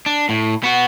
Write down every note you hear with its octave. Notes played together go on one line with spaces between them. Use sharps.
D4
A2
B3 F#4